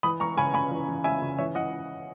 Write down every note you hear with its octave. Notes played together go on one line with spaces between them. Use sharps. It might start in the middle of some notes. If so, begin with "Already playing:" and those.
E3 B5 D#6
E3 A#5 C#6
C#3 G#5 B5
C#3 G#5 B5
E3
E3
C#3 E5 G#5
C#3
E3 C#5 E5
E3 D#5 F#5